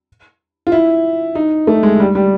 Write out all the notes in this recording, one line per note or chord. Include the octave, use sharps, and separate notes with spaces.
F4
E4
D#4
A3
G#3
G3
G3